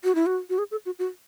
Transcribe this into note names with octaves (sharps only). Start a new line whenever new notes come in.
F#4
E4
F#4
F#4
G#4
A4
F#4
F#4